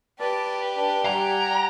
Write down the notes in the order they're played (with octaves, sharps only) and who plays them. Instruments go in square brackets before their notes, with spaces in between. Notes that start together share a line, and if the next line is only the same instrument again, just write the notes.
[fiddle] G4 [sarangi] B4 [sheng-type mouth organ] D5 A5
[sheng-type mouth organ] D4
[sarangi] G3 [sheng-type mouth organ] F#5 G#5 [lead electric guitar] A#5